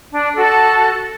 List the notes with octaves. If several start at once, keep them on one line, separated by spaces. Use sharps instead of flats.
D4
F#4 A4